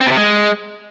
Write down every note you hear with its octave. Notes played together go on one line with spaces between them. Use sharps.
C4
B2
C3
G#3